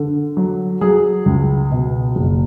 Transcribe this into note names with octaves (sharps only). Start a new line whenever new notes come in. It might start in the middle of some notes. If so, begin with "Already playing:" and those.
Already playing: D3
F#3
F#3 G#4
C#2
B2
F#1